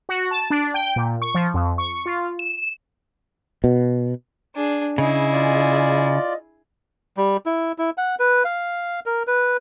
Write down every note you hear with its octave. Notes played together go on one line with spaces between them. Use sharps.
F#4
A5
D4
G5
A#2
C#6
F3
F2
C#6
F4
E7
B2
D4 G#4
C#3 E4 G#4 D#5
F4 D5
G3
E4
E4
F#5
B4
F5
A#4
B4